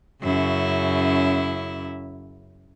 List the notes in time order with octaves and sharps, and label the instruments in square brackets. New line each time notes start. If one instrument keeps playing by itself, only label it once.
[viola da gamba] F#2 C#3 E4